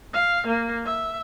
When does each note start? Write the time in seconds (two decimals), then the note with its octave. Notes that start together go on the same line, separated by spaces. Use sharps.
0.14 F5
0.48 A#3
0.85 E5